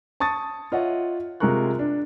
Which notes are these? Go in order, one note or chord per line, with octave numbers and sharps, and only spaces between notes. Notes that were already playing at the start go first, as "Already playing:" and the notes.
A5 C#6 D#6 A6
F4 C#5 D#5 E5 F#5
C3 G#3 F4 A#4 C#6 F#6
D4